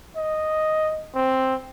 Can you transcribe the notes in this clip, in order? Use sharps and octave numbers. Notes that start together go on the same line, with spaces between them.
D#5
C4